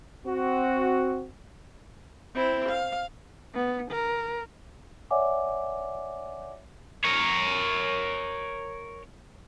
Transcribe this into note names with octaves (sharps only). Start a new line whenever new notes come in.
C4 F#4
C4 E4
F5
B3
A#4
C#5 D5 E5 F#5 G#5 D6
A#4 C#5